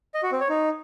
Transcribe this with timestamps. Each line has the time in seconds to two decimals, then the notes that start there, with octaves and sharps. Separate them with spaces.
0.14 D#5
0.23 F#4
0.32 C4
0.40 C#5
0.49 D#4